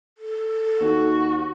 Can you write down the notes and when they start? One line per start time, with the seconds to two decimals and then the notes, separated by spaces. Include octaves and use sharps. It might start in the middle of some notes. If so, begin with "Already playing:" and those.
0.18 A4
0.81 D#2 F#4